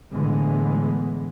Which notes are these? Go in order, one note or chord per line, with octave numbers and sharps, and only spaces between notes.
A2 D3 E3 G#3 B3